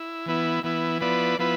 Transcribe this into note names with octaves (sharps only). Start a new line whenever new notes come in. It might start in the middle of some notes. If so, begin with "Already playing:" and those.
Already playing: E4
E3 B3 E4
E3 B3 E4
F3 B3 E4 B4 D5
F3 B3 E4 B4